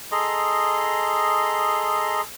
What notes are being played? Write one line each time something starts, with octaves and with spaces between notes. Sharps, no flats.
G#4 A4 D#5 A#5 C6